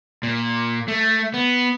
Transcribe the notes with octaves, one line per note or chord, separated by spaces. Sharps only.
A#2
A3
B3